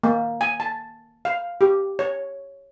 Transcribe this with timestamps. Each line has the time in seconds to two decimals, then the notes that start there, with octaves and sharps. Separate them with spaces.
0.03 A#3
0.41 G#5
0.60 A5
1.25 F5
1.61 G4
1.99 C#5